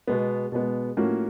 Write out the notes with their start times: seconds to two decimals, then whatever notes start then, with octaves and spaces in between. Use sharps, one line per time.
0.07 B2 G#3 B3
0.52 B2 G#3 B3
0.97 A2 F3 A#3 C#4 F#4